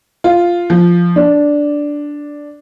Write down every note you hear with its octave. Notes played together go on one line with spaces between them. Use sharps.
F4
F3
D4